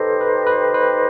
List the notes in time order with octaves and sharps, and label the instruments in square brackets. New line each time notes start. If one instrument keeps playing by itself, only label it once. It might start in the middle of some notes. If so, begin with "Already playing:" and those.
Already playing: [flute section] D#4 G4 C5 D#5 [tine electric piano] A4 B4
[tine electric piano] B4
B4
B4